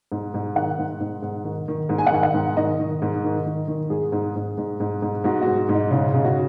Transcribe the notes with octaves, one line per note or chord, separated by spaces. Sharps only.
G#2
G#2
D#3 F#5
G#2
G#2
G#2
D#3
D#3
G#2
G#5
F#5
D#3 G#5
F#5
G#2
D#3 D#5
D#3
G#2
D#3
D#3
D#3
G#2 G#4
G#2
G#2
G#2
G#2
G#2
G#2 F#4
G#2 F#4
G#2
D#4
C#3 D#4
D#4
C#3
F#4